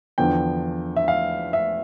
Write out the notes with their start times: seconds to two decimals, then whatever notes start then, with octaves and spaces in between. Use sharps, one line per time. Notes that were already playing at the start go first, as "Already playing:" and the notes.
0.18 E2 D3 F3 G5
0.96 E5
1.08 F5
1.53 E5